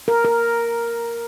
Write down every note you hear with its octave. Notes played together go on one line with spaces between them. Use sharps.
A#4
A#4